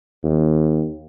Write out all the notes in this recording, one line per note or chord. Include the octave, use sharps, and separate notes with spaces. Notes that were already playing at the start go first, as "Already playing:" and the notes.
D#2